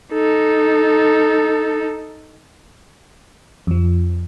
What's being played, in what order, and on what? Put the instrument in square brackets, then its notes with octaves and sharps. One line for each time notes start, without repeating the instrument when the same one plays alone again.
[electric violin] D#4 A4
[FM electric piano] F2 F3